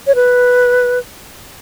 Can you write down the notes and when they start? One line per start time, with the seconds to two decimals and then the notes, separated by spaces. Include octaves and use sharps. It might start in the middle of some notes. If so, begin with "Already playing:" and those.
0.07 C#5
0.15 B4